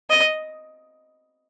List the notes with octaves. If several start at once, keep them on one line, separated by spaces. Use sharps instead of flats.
D#5